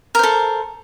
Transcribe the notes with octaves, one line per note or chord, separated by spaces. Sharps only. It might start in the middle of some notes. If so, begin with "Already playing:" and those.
A4 A#4 C5